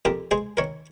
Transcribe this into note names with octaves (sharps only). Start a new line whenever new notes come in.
F2 G4 A#4
G#3 G#4 C5
D#3 A#4 C#5